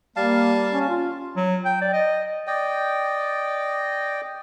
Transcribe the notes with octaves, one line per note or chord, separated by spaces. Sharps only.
G3 A#3 F5 A5
C#4
F4
F#3
G5
D5
D#5
D5 D#5 G5